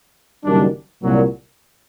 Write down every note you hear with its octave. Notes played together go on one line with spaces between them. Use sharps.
F#1 F#2 D#3 G3 D4
C2 A#2 F#3